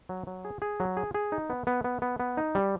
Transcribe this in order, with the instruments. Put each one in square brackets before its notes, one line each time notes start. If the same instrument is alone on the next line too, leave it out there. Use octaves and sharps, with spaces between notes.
[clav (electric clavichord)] F#3
F#3
G#4
G#4
F#3
G#4
G#4
D#4
B3
B3
B3
B3
B3
D#4
G3